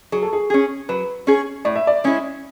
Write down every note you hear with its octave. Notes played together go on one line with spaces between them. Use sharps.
F#3 G#4
A4
G#4
C#4 G#4
F#3 B4
C#4 G#4
A2 D5
E5
D5
G#3 C#4 E4